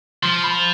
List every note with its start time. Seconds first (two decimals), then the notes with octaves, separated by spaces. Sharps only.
0.23 F3 C6
0.44 B5